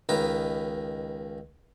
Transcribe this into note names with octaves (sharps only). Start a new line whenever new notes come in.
C#2 D#3 B4 A#5 B5